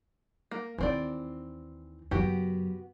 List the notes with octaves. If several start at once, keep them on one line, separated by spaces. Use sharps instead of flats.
A#3
D#2 E3 C4 D#4 D5
F#2 C#3 B3 F#4 G4